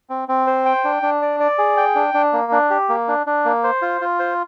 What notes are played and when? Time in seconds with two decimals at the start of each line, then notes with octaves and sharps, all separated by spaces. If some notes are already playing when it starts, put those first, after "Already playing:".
0.10 C4
0.28 C4
0.47 C5
0.65 G5
0.84 D4
1.03 D4
1.22 D5
1.40 D5
1.58 G#4
1.77 G5
1.95 D4
2.14 D4
2.33 A#3
2.52 D4
2.70 G4
2.89 A#3
3.08 D4
3.27 D4
3.45 A#3
3.64 C5
3.82 F4
4.01 F4
4.19 C5